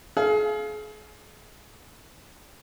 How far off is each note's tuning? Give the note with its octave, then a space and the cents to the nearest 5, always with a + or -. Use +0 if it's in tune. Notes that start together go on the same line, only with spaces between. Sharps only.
G#4 +35 F5 -15